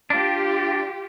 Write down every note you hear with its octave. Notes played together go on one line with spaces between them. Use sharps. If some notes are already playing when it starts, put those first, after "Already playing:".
D4 F4 G4